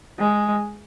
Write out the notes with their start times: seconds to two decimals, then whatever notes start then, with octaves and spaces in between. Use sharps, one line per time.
0.19 G#3